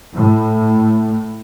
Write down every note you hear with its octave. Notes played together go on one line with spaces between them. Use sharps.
A2